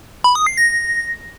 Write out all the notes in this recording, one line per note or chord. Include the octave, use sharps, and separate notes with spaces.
B5
D#6
C7
A#6